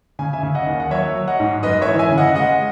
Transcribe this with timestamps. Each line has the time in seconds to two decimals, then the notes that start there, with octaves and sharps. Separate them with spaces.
0.19 C#3 G#5
0.33 E5 G#5
0.43 C#3
0.55 D#5 F#5
0.67 D#2
0.80 F#5
0.91 F#3 C#5 E5
1.15 F#3
1.27 D#5 F#5
1.40 G#2
1.63 F#2 B4 D#5
1.82 C#5 E5
1.88 E3
1.99 E5 G#5
2.11 C#3
2.18 D#5 F#5
2.35 G#3 D#5 F#5